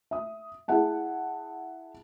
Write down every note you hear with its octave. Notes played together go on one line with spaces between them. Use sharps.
E5 D#6
E4 G#4 E5 F#5 A5